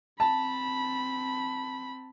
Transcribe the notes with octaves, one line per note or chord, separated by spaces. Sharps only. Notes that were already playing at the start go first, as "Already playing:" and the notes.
C4 A5 B5